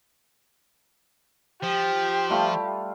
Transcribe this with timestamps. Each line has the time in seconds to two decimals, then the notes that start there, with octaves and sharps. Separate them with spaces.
1.63 F3 G4
2.29 G3 A3 F4